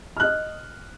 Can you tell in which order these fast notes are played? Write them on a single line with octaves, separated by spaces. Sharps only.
F6 F#6 D#5